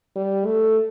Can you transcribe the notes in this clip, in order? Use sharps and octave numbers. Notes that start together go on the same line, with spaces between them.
G3
A3